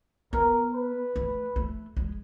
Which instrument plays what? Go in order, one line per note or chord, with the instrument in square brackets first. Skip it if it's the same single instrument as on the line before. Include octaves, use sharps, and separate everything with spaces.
[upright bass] B3 [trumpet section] A#4
[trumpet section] B4
[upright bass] A3
A3
G#3